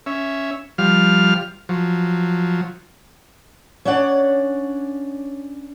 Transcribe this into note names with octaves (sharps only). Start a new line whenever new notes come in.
C#4 E5
F3 G3 F5 F6
F3 F#3
C#4 D4 C#5 D5 F#5